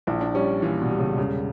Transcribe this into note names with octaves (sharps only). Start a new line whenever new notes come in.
A#1 E4
D4
G3 C#4
A#2 E3
B2
G3
C#3
E1 C#3